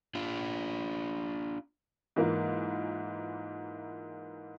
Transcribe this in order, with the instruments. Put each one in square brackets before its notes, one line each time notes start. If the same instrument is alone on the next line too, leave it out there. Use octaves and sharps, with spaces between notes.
[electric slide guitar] D4 F4
[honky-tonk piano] G#2 E3 A#3 F4